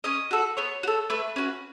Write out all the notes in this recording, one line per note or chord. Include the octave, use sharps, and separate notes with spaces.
C#4 D#5
F#4 A4
B3 C#5
F#4
A4
A3 B4
C#4 F#4